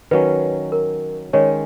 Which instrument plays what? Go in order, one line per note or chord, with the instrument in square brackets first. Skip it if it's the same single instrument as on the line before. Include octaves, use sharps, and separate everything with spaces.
[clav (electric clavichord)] D#3 F#3 C#4 [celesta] B4
[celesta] A#4
[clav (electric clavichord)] D#3 G#3 C#4 [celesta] C#5